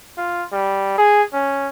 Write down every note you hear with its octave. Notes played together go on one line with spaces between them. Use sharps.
F4
G3
G#4
C#4